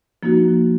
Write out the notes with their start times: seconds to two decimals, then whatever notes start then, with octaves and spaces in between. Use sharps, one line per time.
0.23 F3 A#3 D#4 F#4